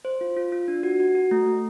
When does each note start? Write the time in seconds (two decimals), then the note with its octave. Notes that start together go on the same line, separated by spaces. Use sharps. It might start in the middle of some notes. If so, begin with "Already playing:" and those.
0.05 C5
0.21 F4
0.37 F4
0.52 F4
0.68 D4
0.83 F#4
1.00 F#4
1.15 F#4
1.31 A3
1.46 A3